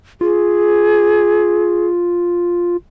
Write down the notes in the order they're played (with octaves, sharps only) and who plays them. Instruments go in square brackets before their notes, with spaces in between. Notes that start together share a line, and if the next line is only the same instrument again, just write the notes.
[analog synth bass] F4 [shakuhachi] G#4